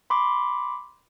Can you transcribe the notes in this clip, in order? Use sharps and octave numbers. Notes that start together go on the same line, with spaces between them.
B5 C6 D6